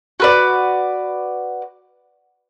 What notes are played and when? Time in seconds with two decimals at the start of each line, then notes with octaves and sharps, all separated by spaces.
0.20 F#4 B4 D5